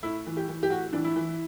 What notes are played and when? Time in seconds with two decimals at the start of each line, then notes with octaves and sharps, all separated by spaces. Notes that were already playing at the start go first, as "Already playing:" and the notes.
0.03 A2 E4
0.27 E3
0.37 G4
0.48 E3
0.63 G4
0.70 A2 F#4
0.93 E3 D4
1.04 E4
1.16 E3